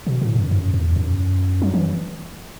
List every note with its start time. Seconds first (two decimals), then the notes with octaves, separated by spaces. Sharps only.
0.07 B2
0.21 A2
0.36 F#2
0.51 F#2
0.74 E2
0.96 F#2
1.62 F#3
1.74 E3